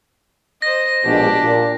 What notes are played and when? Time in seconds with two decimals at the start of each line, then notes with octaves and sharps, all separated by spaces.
0.62 C5 D#5 A#6
1.05 A#1 B2 G#3 D4 G4
1.41 A#2